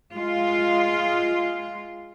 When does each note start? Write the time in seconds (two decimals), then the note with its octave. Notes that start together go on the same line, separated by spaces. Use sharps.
0.12 G#3 F4